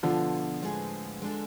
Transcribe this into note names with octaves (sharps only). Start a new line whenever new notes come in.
B2 D3 F3 B3 D4 F4
A2 G#3 C4 G#4 B4
G#3 D4 A4